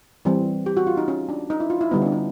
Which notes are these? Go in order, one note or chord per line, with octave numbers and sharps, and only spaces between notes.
E3 G3 C4
G4
F#4
F4
D#4
C#4
D4
D#4
E4
F4
E4
D3 G3 B3 D#4
C#4
D4
D#4